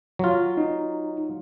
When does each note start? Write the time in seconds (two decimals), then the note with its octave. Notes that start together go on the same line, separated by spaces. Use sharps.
0.19 F#3 F4
0.57 D#4